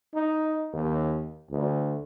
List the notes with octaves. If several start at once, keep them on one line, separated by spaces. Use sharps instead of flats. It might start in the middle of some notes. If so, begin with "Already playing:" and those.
D#4
D#2
D2